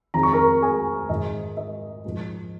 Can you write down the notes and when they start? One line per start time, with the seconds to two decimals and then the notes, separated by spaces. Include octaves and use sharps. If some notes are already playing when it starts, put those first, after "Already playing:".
0.14 F2 D#3 G#3 A#5
0.23 C#6
0.33 A#4 A#5
0.62 G#4 G#5
1.09 G#2 D#3 G#3 D#5
1.57 D#5
2.05 G#2 F3 G#3